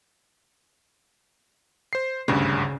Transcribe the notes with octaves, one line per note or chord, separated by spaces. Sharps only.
C5 C7
G#1 D2 G2 C#3